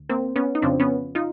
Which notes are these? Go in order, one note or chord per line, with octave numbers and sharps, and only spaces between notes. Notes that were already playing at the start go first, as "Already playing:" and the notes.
Already playing: D2
A#3 C4
B3 C#4
D#4
F2 C#3 F3 C4 D4
B3 C#4
D#4 F4